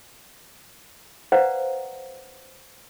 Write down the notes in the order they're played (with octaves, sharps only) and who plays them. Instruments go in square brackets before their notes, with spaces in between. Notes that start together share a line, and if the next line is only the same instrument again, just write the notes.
[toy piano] B4 C5 D5 F5 F#5 A#5